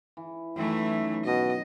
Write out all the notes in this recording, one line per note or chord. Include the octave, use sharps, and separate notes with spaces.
E3
F#2 D#3 E3 A3
B2 D#5